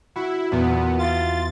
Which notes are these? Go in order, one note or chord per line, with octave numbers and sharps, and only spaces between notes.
E4 F#4
E2 A#2 B3
F4 A6